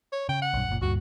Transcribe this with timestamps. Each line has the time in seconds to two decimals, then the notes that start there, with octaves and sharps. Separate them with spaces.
0.12 C#5
0.29 C#3 G5
0.42 F#5
0.54 B1 G2
0.69 F#1 A#2
0.82 D2 G2 A#2 F#4